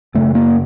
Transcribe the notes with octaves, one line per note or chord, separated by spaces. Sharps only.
F#2 C#3 A3
A#3